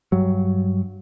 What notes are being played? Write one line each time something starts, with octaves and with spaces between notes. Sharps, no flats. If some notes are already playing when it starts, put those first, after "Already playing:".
G2 F#3